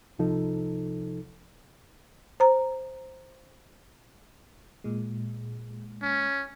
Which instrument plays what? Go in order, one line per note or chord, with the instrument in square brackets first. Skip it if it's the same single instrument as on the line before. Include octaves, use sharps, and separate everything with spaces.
[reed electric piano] C2 C3 F3 D#4 A4
[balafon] C5 A#5
[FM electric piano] A#2 G#3
[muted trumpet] C#4